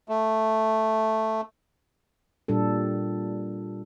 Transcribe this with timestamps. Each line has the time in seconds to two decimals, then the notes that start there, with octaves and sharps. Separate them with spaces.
0.09 A3
2.48 A#2 G3 D4 A4